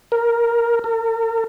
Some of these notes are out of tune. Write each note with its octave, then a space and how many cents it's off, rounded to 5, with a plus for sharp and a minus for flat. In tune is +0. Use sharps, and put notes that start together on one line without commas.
A#4 +5
A#4 -40